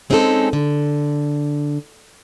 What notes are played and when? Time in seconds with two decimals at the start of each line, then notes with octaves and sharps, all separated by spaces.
0.10 G#3 C4 C#4 D#4 G#4 A4
0.53 D3